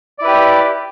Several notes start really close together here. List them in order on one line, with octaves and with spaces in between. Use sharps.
D5 E4 B4 G4